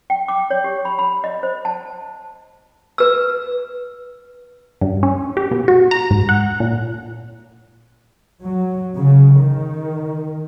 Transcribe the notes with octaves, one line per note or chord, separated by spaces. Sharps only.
G5
D6
C#5
G4
B5
B5
D#5
C5
A5
B4 E6
G2
C#4
G4
B2
F#4
A#5
G#2
F#5
A#2
F#3
C#3
D#3